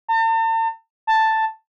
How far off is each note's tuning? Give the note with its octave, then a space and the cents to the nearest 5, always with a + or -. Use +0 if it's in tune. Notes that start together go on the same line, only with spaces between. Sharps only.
A5 +45
A5 +5